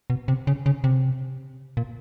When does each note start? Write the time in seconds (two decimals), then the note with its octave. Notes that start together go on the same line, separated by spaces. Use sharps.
0.10 B2
0.28 C3
0.47 C#3
0.66 C#3
0.84 C3
1.77 A#2